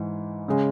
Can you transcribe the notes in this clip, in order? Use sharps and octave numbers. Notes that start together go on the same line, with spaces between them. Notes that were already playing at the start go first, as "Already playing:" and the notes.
Already playing: G#2 E3
C#3 G#3